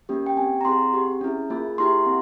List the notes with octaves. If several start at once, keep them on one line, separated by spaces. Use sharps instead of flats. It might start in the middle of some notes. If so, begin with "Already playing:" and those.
A#3 C#4 G4
G5
C4 G4 G#5
A#5
C4 E4 G#4 C6
C4 G4
C#4 E4 G#4
A#3 F4 G#4
A#3 E4 G4 C6
C4